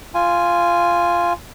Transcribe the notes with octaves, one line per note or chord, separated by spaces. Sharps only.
F4 G#5